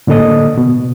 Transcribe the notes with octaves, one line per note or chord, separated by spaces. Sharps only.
A2 D3 A#3 A4 D#5 D#6
B2